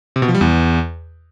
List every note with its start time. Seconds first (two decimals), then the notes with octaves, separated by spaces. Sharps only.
0.16 C3
0.22 B2
0.28 F3
0.35 G3
0.41 E2